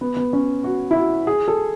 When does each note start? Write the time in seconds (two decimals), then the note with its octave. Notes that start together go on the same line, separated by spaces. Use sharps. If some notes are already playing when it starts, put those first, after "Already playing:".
0.01 B3
0.17 B3
0.33 C#4
0.64 F#4
0.91 E4
0.96 F#4
1.27 G#4
1.48 A4